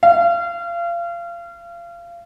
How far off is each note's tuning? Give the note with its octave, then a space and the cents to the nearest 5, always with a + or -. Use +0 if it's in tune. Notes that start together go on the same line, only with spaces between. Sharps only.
F5 -30